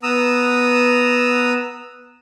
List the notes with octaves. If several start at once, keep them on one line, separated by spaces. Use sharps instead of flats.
B3 A#5 D#6 E6